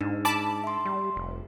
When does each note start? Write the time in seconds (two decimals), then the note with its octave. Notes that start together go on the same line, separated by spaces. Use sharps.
0.01 G#2 D4 D#4
0.25 A5 B5 D6
0.64 E5 C6
0.85 G3
1.16 F1